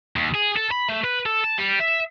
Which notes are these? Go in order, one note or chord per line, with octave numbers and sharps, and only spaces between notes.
D#2
G#4
A4
B5
A3
B4
A4
A5
G3
E5